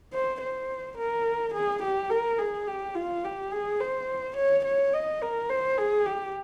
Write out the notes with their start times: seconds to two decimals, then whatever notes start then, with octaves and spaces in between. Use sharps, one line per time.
0.13 C5
0.41 C5
0.97 A#4
1.54 G#4
1.83 G4
2.10 A#4
2.38 G#4
2.67 G4
2.95 F4
3.24 G4
3.51 G#4
3.80 C5
4.37 C#5
4.65 C#5
4.94 D#5
5.22 A#4
5.49 C5
5.78 G#4
6.06 G4